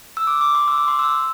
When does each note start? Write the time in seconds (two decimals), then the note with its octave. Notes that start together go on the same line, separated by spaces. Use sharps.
0.17 E6
0.27 D6
0.41 D6
0.55 C6
0.68 E6
0.78 D6
0.88 C6
0.99 E6